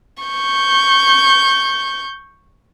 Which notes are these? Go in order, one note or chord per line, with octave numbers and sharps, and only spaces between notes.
C#6 G6